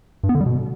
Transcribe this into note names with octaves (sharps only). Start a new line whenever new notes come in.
G2
B3
D3
G3
B2